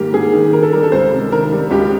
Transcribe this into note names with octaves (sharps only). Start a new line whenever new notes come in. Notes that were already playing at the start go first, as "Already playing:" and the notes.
Already playing: G#2 D#3 G3 A#3 G4
G#2 G#4
D#3
D#3 A#4
A4
G3 A#4
A4
C#2 C5
C3
D#3 A#4
G3
C#2 G4